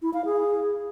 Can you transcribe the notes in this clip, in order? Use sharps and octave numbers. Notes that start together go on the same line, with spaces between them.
E4
F5
G#4